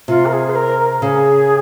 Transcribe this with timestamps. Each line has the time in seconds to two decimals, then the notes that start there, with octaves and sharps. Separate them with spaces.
0.08 C3 F4
0.25 A#4
0.32 G#4
0.49 C5
0.55 A#4
0.78 A#4
1.02 C#3 G#4